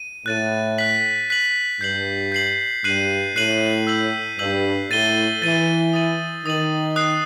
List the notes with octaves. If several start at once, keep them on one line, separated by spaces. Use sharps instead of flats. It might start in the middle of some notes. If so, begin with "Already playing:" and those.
Already playing: D#7
A2 F#6 A6 D#7
F#6 B6 F#7
F#6 B6 F#7
G2 G6 C7 F#7
G6 C7 F#7
G2 F#6 C7 D#7 F#7
A2 F#6 C7 D#7 F#7
E6 G6 B6 F#7
G2 E6 G6 B6 F#7
A2 A6 D#7 G7
E3 A6 D#7 G7
D#6 A6 D#7 F#7
D#3 D#6 A6 D#7 F#7
D#6 F#6 C7